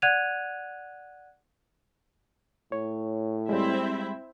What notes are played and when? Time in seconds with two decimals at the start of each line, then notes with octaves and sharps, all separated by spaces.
0.02 D5 F#5 F#6 G#6 D#7 F7
2.72 A2 C#5
3.49 G3 G#3 C4 E4 E5